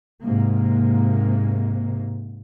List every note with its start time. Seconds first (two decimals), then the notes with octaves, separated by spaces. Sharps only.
0.23 G#2 C3 A#3